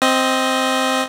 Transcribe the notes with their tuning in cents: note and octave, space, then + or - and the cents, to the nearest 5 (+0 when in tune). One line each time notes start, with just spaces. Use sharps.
C4 +0 D#5 +10